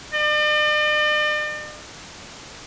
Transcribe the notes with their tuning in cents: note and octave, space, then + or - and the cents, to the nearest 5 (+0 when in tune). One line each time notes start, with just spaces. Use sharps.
D5 +45